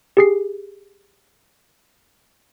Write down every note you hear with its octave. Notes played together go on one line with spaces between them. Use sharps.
G4 G#4 C7